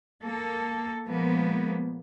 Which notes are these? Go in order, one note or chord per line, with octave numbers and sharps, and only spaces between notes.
A#3 A4
A#2 F3 G#3 A#3 B3